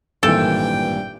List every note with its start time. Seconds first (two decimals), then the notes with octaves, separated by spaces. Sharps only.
0.23 G#1 G2 A#2 E3 A4 G5